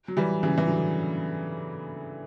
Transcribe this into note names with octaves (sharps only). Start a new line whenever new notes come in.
F#3
E3 G3
C#3 E3
E3
D3 F#3